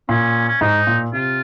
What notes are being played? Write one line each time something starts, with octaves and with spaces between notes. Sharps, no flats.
A#2 C#4
C#4
G#2 D#4
A#2
C3 F4